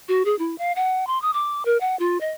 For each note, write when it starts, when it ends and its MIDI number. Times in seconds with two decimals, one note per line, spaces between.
0.09 0.23 66
0.25 0.38 68
0.39 0.58 64
0.58 0.72 77
0.76 1.07 78
1.07 1.21 84
1.22 1.31 87
1.34 1.63 86
1.65 1.77 70
1.81 1.98 78
1.99 2.18 65
2.21 2.31 75